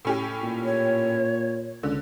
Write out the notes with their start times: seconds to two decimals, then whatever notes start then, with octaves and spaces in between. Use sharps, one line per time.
0.05 A2 C#4 G4
0.43 A#2
0.64 C#5
1.83 C#2 D3